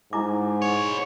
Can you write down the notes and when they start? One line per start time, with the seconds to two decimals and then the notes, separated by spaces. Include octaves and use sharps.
0.13 G#2 E4 A#5 D6
0.62 B4 C#5